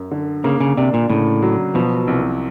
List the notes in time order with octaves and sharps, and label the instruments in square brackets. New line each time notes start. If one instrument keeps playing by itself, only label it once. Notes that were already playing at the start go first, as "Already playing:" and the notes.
Already playing: [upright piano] F#2
D3
[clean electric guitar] C#3 [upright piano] A#3
[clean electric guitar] C#3
[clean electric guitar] C3 [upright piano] D4
[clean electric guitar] A#2
[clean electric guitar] A2 [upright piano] C#3
[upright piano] F#3
[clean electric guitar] B2 [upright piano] F3
[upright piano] C2